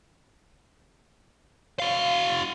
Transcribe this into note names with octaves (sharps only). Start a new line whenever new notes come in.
F#4 F5